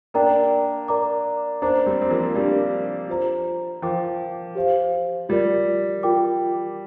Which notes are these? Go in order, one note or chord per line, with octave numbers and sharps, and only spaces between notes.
A#3 D4 A#4 D5 G5 A#5
A#4 D5 A#5 D6
A#3 D4 C5 A#5 D6
G3 C4
C4
F3 A#3
G3 D4 G4 A#4 D5
F4 C5 A#5
F3 A#4 G5 D6
G4 C5 F5
G3 F4 A#4 D5
F4 A#4 G5 D6